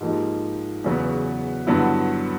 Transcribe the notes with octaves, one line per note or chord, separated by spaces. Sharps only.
G#2 F3 A#3 D#4 G4
E2 C#3 F#3 B3
G2 D3 F#3 B3 E4